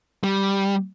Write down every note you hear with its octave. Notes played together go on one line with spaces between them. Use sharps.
G3